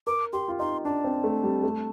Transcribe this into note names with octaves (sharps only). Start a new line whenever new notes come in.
A#4 D6
G4 C6
F4
D#4 C6
D4 A5
C4
A3
G3
A3